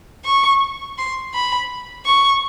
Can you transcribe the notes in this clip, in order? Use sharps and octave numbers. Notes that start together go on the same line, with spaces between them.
C#6
C6
B5
C#6